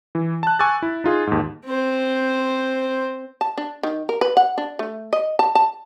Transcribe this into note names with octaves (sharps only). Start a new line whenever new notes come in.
E3
A5 F#6
G#5 C#6 D6 E6 F#6 A6
E4
D#4 F4 G#4
D#2 G#2
C4 C5
A5
D4
D#3
A#4
B4
F#5
D4
A3
D#5
A5
A5